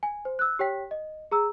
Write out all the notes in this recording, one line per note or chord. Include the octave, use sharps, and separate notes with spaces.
G#5
C5
E6 F#6
G4 C#5 G5 B6
D#5
G#4 A#5 E6